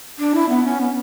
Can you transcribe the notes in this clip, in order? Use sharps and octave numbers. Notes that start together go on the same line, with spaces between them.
D4
E4
B3
C#4
B3